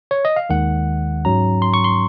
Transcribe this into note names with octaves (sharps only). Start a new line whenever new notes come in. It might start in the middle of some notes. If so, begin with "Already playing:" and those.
C#5
D#5
F5
D#2 D#3 G#3 F#5
G#2 F#3 C#4 A#5
C6
C#6
C6